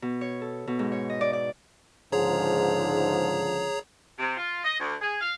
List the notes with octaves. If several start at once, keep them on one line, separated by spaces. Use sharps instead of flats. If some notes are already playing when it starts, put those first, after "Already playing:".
B2
C#5
A4
B2
G#2
C#5
D#5
D5
D5
C#2 G#2 D3 F3 G#4 C#5 A#5
C3
F4
D#5
D2
G#4
F5